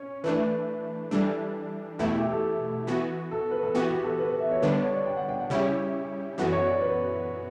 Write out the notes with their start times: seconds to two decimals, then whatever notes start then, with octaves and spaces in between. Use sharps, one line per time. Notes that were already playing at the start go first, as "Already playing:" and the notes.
Already playing: C#4 C#5
0.24 E3 A3 D4 B4
1.11 E3 G3 D4 A4
1.99 E2 B2 A3 E4 G4
2.10 G4
2.21 G4
2.32 A4
2.87 E3 B3 F#4
3.31 A4
3.51 B4
3.63 A4
3.75 E3 B3 F#4 G4
3.89 G4
4.04 A4
4.19 B4
4.30 B4
4.40 E5
4.52 C#5
4.62 D3 G3 B3 D4 B4
4.73 C#5
4.84 C#5
4.95 D5
5.06 G5
5.17 F#5
5.29 G5
5.39 F#5
5.50 C#3 G3 C#4 E4 G4 C#5
6.38 F#2 E3 B3 F#4 A4
6.52 C#5
6.67 D5
6.82 B4